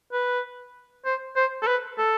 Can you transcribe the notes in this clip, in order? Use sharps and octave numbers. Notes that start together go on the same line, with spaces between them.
B4
C5
C5
A4
B4
A4